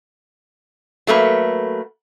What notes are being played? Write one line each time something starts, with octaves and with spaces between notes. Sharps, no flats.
F#3 A3 A#3 B4